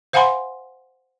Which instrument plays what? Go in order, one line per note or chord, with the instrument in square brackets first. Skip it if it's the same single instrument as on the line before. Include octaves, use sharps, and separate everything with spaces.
[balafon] C5 F5 F#5 G#5 B5 C6